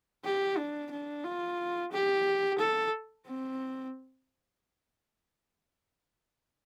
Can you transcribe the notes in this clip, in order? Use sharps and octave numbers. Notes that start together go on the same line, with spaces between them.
G4
D4
D4
F4
G4
A4
C4